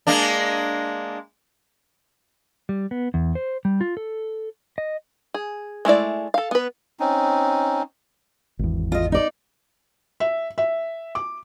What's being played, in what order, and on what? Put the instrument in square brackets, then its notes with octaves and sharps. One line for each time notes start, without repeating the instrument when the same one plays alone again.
[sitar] G#3 A#3 D4
[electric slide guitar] G3
B3
E2
C5
G3
F4
A4
D#5
[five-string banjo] G#4
G#3 A3 E4 D5
A4 F5
B3 B4
[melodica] C4 C#4 D#4
[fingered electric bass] G#1 E2
[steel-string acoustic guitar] F4 D#5
D#4 D5
[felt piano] E5
E5
D6